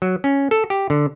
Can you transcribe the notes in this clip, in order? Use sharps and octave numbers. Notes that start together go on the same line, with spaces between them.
F#3
C#4
A4
G4
D3